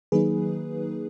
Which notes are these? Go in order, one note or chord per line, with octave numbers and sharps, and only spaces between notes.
D#3 F#3 A#3 D#4 G#4 B4